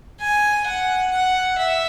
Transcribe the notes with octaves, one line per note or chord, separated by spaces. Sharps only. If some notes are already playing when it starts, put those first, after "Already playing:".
G#5
F#5
F#5
E5